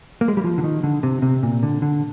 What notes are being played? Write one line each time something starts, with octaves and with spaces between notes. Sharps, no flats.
A#3
G#3
G3
F3
D3
D#3
D3
C3
C3
A#2
D3
D3